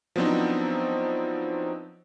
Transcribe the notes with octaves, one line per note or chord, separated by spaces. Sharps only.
F3 F#3 B3 C4 D4 D#4